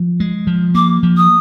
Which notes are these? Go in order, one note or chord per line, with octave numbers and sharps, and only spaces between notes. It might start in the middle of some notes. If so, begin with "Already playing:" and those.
Already playing: F3
G#3
F3
A#3 D6
F3
D#6